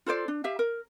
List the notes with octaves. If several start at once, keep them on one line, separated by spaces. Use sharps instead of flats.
F4 A4 C5 D5
D4
G4 E5 F5
A#4